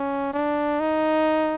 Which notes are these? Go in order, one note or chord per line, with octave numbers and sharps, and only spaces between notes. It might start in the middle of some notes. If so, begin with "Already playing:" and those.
Already playing: C#4
D4
D#4